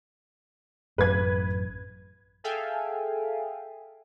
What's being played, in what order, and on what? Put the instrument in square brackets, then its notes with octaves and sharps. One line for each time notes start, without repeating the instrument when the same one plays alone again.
[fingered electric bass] A1 F#2 [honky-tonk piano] B4 G#6
[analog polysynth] G#4 A4 E5 F5 G5 G#5